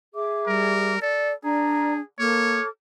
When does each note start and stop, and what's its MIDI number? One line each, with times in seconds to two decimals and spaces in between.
0.14 0.93 68
0.14 0.93 76
0.14 0.93 86
0.47 0.98 55
0.47 1.00 70
1.02 1.33 69
1.02 1.33 74
1.44 2.01 62
1.44 2.04 68
1.44 1.93 74
1.44 1.93 82
2.19 2.60 58
2.19 2.68 69
2.19 2.66 73
2.19 2.68 86
2.19 2.68 89